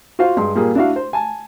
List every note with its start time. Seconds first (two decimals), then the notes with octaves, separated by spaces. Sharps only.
0.19 F4 F#4 C5 F5
0.37 G2 G#3 C6
0.55 A#2 G3 A#3 G#4
0.75 D4 E4 F#4 F5
0.96 C5
1.13 G#5 A5